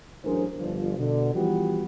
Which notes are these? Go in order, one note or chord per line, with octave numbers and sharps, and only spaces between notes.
A1 F#3 D4 G#4 A#4 C5
G1 F3
B2 D3
E3 F3 G3 B3 F#4 G4